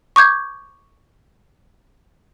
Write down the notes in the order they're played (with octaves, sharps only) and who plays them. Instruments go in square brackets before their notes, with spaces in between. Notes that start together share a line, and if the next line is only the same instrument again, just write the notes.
[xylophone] C#6 D6 G6 G#6